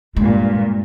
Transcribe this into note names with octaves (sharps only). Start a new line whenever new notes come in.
G2 A#2 G#3